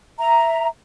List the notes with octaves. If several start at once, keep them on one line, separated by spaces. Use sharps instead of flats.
E5 A#5